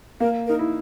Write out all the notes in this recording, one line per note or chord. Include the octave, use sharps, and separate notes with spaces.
A#3 A#4
D#4 A#4
E4